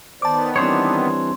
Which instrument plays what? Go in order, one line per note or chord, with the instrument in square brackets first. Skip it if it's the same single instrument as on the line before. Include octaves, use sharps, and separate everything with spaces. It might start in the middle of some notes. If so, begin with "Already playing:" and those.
[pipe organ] D#3 B3 [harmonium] C5 D5 [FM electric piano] A5 D6
[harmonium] E3 G3 D4 [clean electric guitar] C4 C5 C#5